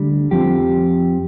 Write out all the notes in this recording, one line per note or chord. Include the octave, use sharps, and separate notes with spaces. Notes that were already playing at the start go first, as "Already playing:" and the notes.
Already playing: D2 D3 G3
F2 F3 C4 G4